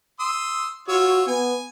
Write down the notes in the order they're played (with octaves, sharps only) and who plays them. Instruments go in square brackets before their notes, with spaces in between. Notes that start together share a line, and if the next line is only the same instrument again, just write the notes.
[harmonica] C6 D#6 E6
[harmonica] F4 C#5 E6 [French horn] F#4
[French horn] B3 [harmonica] G#5